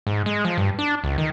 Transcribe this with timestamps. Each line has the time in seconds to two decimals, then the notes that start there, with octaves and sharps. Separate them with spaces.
0.07 G#2
0.26 G#3
0.45 F3
0.58 G2
0.79 D4
1.04 C#2
1.18 D#3